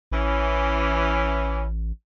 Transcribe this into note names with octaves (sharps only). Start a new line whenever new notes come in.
A1 E3 C#4